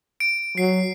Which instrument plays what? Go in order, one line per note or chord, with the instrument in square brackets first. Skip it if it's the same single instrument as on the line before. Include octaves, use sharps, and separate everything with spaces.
[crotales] D7
[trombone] F#3 [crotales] C7